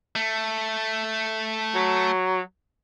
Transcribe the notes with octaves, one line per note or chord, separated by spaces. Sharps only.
A3
F#3